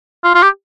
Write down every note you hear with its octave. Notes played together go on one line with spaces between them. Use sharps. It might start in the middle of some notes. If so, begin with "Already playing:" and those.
F4
F4
G4